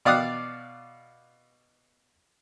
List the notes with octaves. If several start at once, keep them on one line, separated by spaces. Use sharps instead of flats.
B2 D5 F5 D#6 F#6